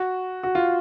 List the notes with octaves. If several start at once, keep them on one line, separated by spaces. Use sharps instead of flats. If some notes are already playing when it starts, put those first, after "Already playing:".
Already playing: F#4
F#4
F4